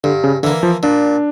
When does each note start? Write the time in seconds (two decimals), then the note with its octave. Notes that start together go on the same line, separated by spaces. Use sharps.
0.04 G2 D3
0.24 C#3
0.43 D3 E3 A#3
0.63 F3
0.83 A#2 D4